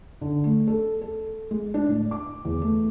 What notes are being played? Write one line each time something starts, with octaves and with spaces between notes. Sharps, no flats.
D3
A3
A4
A4
G#3
D4
A2
D6
E2
A3